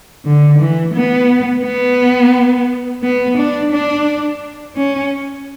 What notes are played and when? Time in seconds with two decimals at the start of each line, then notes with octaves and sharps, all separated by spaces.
0.25 D3
0.59 E3
0.94 B3
1.64 B3
3.03 B3
3.37 D4
3.72 D4
4.76 C#4